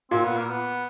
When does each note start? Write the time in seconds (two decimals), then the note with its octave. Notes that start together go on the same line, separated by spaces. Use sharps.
0.11 A#2 C4
0.24 B3
0.37 A#3
0.50 B3